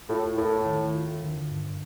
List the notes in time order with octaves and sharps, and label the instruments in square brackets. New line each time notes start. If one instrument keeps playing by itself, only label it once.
[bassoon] A2 [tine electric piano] F4
[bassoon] A2 [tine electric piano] A#4
[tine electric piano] D#3
F4
D3
G2